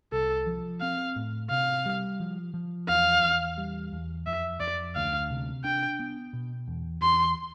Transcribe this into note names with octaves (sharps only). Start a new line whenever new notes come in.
C2 A4
F3
C4 F5
A2
C3 F5
G3
F3
F3
E2 F5
E2
G3
E2
F2 E5
F2 D5
D2 F5
C3
D4 G5
B3
B2
E2
E2 C6